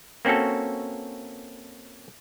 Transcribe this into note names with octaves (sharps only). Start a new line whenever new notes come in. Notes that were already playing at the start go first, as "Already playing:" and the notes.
A#3 C4 C#4 F#4 A4